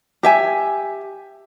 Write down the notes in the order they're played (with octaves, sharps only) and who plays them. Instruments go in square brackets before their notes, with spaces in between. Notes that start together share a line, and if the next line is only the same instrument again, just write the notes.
[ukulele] G4 E5 G#5